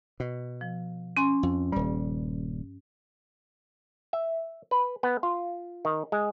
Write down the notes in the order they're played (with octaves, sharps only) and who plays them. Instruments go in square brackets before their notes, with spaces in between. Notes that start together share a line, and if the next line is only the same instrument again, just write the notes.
[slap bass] B2
[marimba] F3
C#4 G#5 C6
[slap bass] F2
[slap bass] D#1 G3 [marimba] G2
[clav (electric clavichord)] E5
B4
B3
F4
D#3
G#3